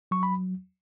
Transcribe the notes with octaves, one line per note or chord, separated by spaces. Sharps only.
F#3 C#6
B5